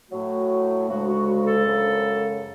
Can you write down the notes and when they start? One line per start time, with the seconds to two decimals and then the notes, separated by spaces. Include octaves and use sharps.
0.10 A2 F#3 A3 F#4
0.88 D2 C#3 G#3 F#4
1.07 F#4
1.26 F#4
1.45 A4
1.65 F#2 C#3 G#3